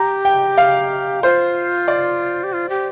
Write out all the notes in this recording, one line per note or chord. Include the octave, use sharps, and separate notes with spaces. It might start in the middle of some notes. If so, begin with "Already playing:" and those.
Already playing: G4 A#5
G5
F5
F4 C5
D5
G4
F4
G4